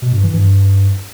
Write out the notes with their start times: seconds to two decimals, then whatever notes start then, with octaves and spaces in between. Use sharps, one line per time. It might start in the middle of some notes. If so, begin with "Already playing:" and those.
0.02 B2
0.13 G2
0.23 E3
0.34 G2